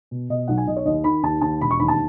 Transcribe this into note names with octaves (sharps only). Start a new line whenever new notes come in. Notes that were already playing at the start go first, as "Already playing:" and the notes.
B2
B2 D#5
B1 F#5
G#5
B1 D#5
C#5
D#2 D#5
D#3 B5
D#2 A5
D#2 A5
E1 B5
C#6
D#2 B5
A5